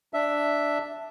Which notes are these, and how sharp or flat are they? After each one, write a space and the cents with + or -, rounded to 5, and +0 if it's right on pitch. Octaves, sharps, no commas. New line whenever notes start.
D4 +0 E5 +0